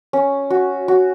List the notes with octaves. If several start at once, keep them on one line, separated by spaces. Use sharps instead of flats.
C#4
F#4
F#4